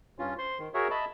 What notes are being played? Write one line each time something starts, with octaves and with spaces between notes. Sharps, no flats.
G2 C#4 F4
C5 C6
D#3
F#4 G#4 A#4 C#5 E5
D#5 E5 A5 B5